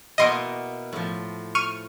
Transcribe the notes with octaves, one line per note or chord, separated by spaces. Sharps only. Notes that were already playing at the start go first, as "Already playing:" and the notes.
B2 A#3 E4 D#5 C6 D7
A2 F3
C#6 F6 D#7